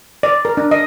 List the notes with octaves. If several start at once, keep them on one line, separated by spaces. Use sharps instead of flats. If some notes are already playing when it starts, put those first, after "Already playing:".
D5
A#4
D4
D#5